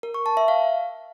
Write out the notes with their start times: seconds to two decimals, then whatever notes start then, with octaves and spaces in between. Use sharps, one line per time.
0.03 A#4
0.14 C#6
0.26 A5
0.37 E5
0.48 F5